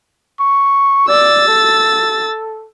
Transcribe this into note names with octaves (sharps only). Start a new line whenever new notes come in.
C#6
D5 E6 A6
A4